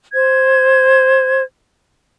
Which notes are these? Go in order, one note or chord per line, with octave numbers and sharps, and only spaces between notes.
C5 G#6